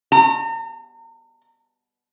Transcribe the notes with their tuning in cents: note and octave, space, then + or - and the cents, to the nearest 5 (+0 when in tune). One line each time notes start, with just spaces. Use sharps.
A#5 -40